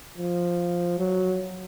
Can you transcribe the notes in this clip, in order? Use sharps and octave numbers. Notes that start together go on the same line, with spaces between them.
F3
F#3